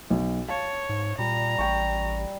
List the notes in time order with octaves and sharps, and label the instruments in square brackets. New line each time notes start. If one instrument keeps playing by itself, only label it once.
[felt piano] B1
[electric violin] C#5 [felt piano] F5 [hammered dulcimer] A5
[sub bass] G#2
[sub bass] A#2 [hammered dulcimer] G3 [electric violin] A#5
[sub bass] A1 [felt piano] G5 C#6